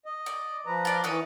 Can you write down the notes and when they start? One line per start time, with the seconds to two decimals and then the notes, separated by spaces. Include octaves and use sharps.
0.06 D#5
0.26 D5
0.66 F3 B4 A#5
0.85 F4 D5
1.04 E3 D#4 B4 C#5